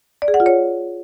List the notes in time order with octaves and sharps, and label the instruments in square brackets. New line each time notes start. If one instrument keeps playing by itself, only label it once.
[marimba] D5
G#4
F#5
F4
C#5